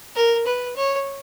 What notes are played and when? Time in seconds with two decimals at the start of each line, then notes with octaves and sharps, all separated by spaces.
0.16 A#4
0.46 B4
0.76 C#5